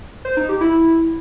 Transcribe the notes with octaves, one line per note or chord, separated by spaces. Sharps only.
C5
D#4
G4
E4